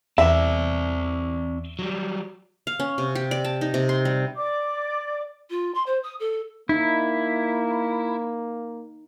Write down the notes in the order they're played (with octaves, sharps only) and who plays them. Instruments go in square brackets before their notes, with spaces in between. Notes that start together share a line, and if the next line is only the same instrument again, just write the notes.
[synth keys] E2 [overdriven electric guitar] C4 D5 [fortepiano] E5
[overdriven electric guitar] F#3 G3
[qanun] F5
C#4
C3
G4
D5
A5
D#4
C3
C6
G3
[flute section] D5 D6
[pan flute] F4
C6
C5
D#6
A4
[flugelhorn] A#3 [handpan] D#4 [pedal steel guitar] E4